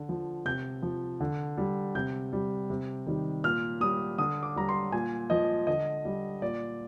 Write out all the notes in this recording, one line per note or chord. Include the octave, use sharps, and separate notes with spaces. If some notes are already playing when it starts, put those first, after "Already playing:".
Already playing: D3
F3
C3 G6
F3
D3
G3
C3 G6
G3
C3
D#3 G3
A#2 F6
G3 D#6
D3 D#6
D6
G3 A#5
C6
A#2 G#5
F3 D#5
D3 D#5
G3
A#2 D5